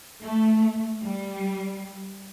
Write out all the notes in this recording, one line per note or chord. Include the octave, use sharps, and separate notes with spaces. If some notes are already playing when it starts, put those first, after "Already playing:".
A3
G3